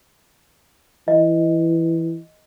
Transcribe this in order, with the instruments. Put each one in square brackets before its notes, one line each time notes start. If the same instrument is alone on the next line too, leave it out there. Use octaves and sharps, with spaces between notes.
[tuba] E3 [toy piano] D#5